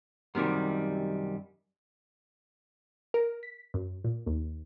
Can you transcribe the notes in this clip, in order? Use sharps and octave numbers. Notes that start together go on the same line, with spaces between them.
F#2 C3 D#3 G3
A#4
B6
F#2
A#2
D#2